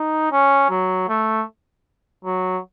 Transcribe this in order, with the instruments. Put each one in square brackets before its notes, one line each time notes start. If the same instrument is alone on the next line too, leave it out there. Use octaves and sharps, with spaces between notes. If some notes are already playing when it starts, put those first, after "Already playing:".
Already playing: [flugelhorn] D#4
C#4
F#3
A3
F#3